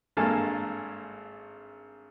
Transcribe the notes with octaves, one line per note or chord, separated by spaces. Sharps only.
G#1 G2 A#3 A4 G#5 A5